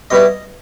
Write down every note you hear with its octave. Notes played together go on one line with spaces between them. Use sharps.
B2 G3 B3 E4 D#5